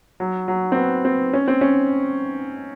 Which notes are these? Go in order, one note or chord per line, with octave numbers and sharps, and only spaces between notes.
F#3
F#3
C4
B3
C4
C#4
C4
C#4